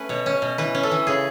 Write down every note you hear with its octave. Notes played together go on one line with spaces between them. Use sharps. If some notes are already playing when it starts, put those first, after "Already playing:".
Already playing: A3 C#4 B4
B2 C#5
C#4
B2
E3 B4
C#4
A4
E3
C#3 G#4